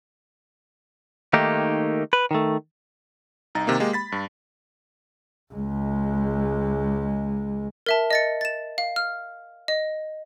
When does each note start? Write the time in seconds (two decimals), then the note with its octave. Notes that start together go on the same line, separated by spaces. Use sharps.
1.33 D#3 A3 A#3 D#4 G4
2.13 B4
2.31 D#3 A3
3.55 C2 D#4 A#5 A6
3.67 C3 D#3 A#3
3.80 G#3 A#3 G4
3.93 B5 A6 B6
4.12 G2
5.53 C#2 G#3
7.86 A#4 E5 A5
8.11 D#5 A6 C#7
8.41 A6 E7
8.78 F5
8.96 F6
9.68 D#5